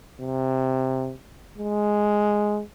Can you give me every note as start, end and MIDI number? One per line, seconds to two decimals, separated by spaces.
0.21 1.14 48
1.58 2.62 56